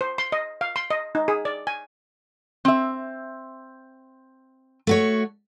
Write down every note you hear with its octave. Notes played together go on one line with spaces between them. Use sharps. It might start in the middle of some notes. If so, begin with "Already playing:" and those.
C5
C6
D#5
F5
C6
D#5
D#4
G#4
D5
G#5
C4 E5
A3 F#4 C#5